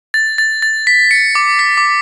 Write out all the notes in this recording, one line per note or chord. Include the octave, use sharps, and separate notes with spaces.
A6
A6
A6
B6
C#7
D6
B6
D6